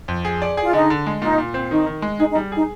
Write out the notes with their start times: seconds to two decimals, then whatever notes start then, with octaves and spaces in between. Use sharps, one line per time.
0.08 F2
0.25 G#4
0.42 D5
0.57 G#4
0.62 F4
0.73 D3 D#4
0.90 D3
1.06 G#3
1.22 A#2 D#4
1.38 A#2
1.54 C4
1.70 D#3 D#4
1.86 D#3
2.02 G#3
2.19 D#4 G#4
2.31 D#4
2.35 G3
2.52 D#4 G#4